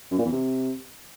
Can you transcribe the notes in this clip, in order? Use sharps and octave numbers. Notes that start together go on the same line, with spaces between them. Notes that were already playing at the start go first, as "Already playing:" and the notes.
F#2
A#2
E2
C3